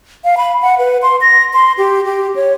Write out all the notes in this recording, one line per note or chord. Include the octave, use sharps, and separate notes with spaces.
F5
B5
F#5
B4
C6
A#6
C6
G4
G4
C#5